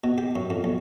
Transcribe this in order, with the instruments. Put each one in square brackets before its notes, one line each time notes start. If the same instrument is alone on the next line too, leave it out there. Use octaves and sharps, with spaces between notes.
[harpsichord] B2
G4
F#2
F2
B1